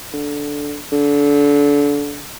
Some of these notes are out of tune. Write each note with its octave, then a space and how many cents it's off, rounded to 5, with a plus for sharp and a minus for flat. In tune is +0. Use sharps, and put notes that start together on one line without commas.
D3 -10
D3 -25